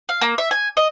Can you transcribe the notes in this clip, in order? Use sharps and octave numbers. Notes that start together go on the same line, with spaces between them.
F5
A#3
E5
G#5
D#5